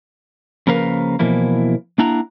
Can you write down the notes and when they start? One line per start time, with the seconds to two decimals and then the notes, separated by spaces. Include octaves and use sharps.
0.67 C#3 F3 A#3 A#4 B4 F5
1.19 B2 E3 F3 A#3 E4
1.98 A#3 D4 E4 F#5 A#5